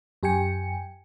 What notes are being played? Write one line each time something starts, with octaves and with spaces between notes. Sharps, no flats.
F#2 G4 G5 G#5 C#7